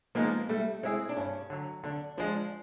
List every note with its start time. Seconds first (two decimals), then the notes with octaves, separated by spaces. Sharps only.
0.15 F3 G#3 A#3 B3 D#4
0.49 G3 A3
0.83 G#3 C4 E4 G#4
1.09 D4
1.16 G2 C#4
1.50 D3 F#3
1.84 D3 D4
2.17 F3 G#3 D4